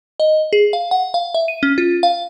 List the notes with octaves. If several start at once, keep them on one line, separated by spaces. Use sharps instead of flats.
D#5
G#4
F5
F#5
F5
E5
D#7
C#4
F4
F5